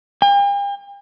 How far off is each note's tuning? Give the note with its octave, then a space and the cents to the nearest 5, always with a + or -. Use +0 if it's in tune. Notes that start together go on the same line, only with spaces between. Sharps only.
G5 +45